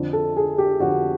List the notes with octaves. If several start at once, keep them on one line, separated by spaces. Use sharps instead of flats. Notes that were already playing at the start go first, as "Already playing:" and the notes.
Already playing: F2 D3
A4
G#4
G4
F2 D3 F#4